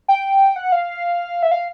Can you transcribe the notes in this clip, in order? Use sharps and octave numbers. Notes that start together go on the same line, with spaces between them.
G5
F#5
F5
E5
F5